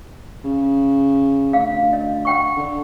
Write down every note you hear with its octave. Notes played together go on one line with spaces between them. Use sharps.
C#3
D2 F5
D#5
F#5 G5 C#6
D3